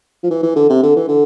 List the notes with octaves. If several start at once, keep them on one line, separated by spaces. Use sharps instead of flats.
F3
E3
E3
D3
C3
D3
E3
D3